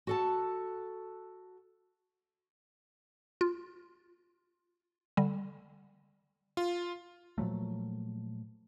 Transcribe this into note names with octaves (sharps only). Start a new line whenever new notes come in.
F#4 A4 A5
F4
D3 G3
F4
A#2 F3 F#3 A3